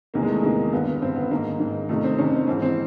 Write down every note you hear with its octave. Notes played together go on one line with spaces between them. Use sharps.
E2 C3 D#3 A#3
G#3
A3
E2 C3 D#3 A#3
G2 D3 B3
B3
G2 D3 C4
B3
G#2 D#3 A#3
G#2 D#3
F2 C3 D#3 A3
C4
F2 C3 D#3 C#4
C4
G#2 E3 C4
C4